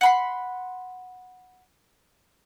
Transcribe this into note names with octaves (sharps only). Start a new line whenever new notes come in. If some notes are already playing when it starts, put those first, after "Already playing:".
F#5 B5 C6